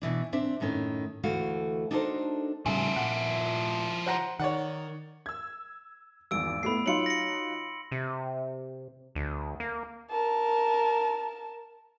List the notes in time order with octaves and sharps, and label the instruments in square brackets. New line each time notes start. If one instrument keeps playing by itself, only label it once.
[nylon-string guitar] B2 E3 D4
C4 D4 E5
F#2 A2 D#3 C#4
D2 E3 A3 F#4 F5
D4 D#4 F#4 A4 A#4 C5
[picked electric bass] A2 C#3 G3 [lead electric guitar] F3 E4 [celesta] G#5
[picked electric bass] A#2 [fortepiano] F#5
[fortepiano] C5 F#5 A#5
[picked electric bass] D#3 [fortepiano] C#5 D5 F#5
[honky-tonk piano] E6 G#6
[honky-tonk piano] G#1 E2 [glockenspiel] E6 D7
[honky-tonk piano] A2 A3 B3 [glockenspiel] B5 C7
[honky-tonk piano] F#3 D#4 F4 [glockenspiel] C6 C#7 F#7
[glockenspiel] A#6 C#7
[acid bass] C3
D2
A#3
[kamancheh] A#4 A5